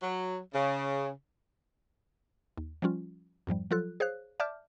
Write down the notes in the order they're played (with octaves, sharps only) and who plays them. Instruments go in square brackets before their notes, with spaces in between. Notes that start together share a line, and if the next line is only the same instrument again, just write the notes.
[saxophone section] F#3
C#3
[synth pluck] D#2
F3 G3 C#4 F4
F2 G#2 F3 G3
F3 F#3 F4 A4 F#6
G#4 C5 C#5 F5 F#6
D5 E5 A5 D6 F6 G6